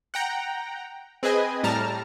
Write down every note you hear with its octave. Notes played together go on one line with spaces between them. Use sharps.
F#5 G5 A#5
C4 G#4 B4 D#5 G#5
A2 G3 A5 A#5 F6